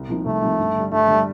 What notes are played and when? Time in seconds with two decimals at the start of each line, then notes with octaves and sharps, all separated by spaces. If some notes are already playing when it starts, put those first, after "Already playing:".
Already playing: C2
0.08 C3 F3 A#3 D#4
0.25 C2 A3
0.42 C3 F3 A#3 D#4
0.58 G2
0.75 D3 G3
0.92 G2 A3
1.08 D3 G3